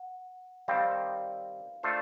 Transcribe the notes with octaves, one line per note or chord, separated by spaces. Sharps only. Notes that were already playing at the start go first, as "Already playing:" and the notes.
Already playing: F#5
D#3 G3 C4 F5
A3 D4 F4 A4 C5